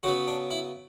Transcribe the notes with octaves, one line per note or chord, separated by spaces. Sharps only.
C#3 F#3 B3 F#4
D4
E4